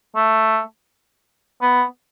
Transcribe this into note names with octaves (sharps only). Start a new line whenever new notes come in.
A3
B3